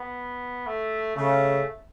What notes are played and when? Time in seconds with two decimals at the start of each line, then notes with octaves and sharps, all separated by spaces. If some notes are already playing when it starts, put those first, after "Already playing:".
Already playing: B3
0.66 A3
1.16 C#3 A3